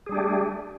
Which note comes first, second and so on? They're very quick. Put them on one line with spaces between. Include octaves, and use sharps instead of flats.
G#4 G3 D4 G4 A3